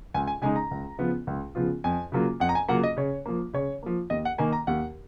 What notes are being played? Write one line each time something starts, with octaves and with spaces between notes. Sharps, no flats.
C#2 G#5
G#5
C#3 G#3 D#4 G#5
A#5
C#2
C#3 F3 B3 F4
C#2
C#3 F3 B3 F4
F2 G#5
C#3 F#3 A#3 F4
F2 F#5
A#5
G#5
C#3 F#3 A#3 F4 F#5
D#5
C#3 C#5
F3 A#3
C#3 C#5
F3 A#3
D#2 D#5
F#5
D#3 A#3 G#5
A#5
D#2 F#5